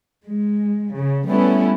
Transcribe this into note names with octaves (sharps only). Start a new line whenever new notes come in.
G#3
C#3
G3 A3 B3 C#4 E4